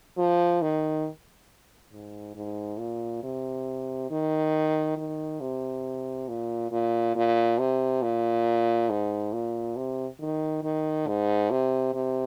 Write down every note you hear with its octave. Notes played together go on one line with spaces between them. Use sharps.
F3
D#3
G#2
G#2
A#2
C3
D#3
D#3
C3
A#2
A#2
A#2
C3
A#2
G#2
A#2
C3
D#3
D#3
G#2
C3
C3